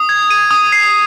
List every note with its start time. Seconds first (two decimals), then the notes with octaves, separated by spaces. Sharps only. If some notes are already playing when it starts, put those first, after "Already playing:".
Already playing: D#6
0.09 G#6
0.30 D#7
0.51 D#6
0.72 C7